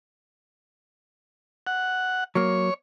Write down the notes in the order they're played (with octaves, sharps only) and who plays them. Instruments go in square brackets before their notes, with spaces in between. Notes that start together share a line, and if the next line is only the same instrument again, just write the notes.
[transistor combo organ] F#5
[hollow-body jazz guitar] F#3 A#3 [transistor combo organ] C#5